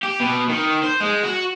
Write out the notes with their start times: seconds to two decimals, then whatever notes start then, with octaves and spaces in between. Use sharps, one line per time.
0.03 G4
0.20 B2
0.49 D#3
0.83 C5
1.00 G#3
1.23 F#4